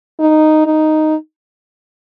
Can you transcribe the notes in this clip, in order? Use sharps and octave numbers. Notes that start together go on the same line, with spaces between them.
D#4
D#4